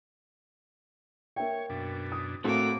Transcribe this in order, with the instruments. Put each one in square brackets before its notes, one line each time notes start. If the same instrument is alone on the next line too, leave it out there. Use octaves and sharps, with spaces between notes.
[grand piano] A#3 E5 G5 [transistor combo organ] C#5
[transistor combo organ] F#2 B2 D4
[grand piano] D#6
[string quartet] A2 A#3 D6 [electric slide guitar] A3 F#4 A4 [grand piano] C4